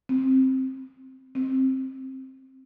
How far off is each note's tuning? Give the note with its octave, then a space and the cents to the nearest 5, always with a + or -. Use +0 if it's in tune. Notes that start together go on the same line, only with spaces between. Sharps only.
C4 +10
C4 +15